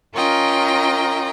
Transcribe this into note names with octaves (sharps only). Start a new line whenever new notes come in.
C#4 F4 A#4 D#5 G5 A#5